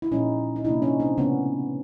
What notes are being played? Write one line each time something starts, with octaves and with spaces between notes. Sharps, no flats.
E4
A#2 F3 G#3 C#4 D#4
D#4
C3 F3 A#3 D4 E4
C#4 D#4
C4 D4
C#3 F3 A3 B3 C#4